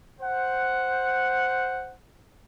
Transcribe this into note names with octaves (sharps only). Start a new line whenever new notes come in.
C5 F#5